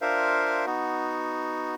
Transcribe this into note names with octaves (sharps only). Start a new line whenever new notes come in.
D4 F4 A#4 C5 E5 F5
B3 D#4 F#4